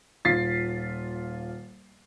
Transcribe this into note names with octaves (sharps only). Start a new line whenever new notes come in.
D#1 F4 A6 B6 C7